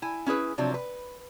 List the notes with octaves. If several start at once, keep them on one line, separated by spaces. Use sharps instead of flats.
E4 G#5
C#4 E4 G#4 B4
C3 F3 F#3 D4
B4